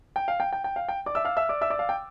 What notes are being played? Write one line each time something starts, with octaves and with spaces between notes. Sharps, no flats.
G5
F5
G5
G5
G5
F5
G5
D5 D6
E5 E6
F5 F6
E5 E6
D5 D6
E5 E6
D5 D6
F5
G5